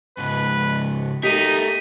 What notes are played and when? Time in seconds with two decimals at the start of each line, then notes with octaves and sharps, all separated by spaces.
0.18 C#2 G#2 B4
1.23 A3 D#4 G4 A#4 B6 D#7